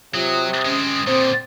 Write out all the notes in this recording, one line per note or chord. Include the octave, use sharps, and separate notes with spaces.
C3 F#3 F4 D#6
G#3 C4 C#4
A#2 D3 C4 C5